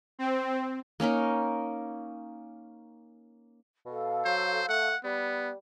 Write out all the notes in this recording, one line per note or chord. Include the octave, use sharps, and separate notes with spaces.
C4
A#3 C#4 D#4 A#4
B2 A4 F5
F#3 C5
A3 F#5
G3 B3